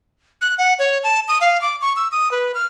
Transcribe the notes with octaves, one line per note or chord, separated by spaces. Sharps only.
F#6
F#5
C#5
A5
D#6
F5
D6
C#6
E6
D#6
B4
F6